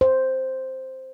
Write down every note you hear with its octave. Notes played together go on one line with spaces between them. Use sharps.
C5